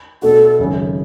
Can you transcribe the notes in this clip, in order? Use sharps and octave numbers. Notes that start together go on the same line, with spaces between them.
B2 A3 D4 F#4 A4
G#1 F#2 C#3 F#3 C#4